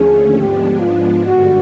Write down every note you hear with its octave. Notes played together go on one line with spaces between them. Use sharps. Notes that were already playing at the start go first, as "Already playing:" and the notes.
Already playing: D#2 D3 F3 A3 C#4 G#4
G#2 F3 G#3 B3 D4 G4
F4
G2 D3 G3 F#4